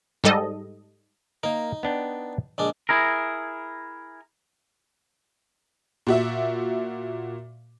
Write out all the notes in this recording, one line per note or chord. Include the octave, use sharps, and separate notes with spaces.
G#2 G3 A4 D#5
A#3 D#4 A#4
B3 D4 G5
A#1 G#3 D4
E4 G#4 A#4
A#2 F#4 E5